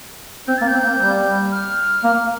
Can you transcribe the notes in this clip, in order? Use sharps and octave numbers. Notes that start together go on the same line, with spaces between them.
C4 G6
A#3 A6
G6
C4
A#3
G3
F6
A#3